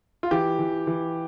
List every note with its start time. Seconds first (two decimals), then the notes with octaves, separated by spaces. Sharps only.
0.23 F4
0.31 E3 G4
0.59 E3
0.87 E3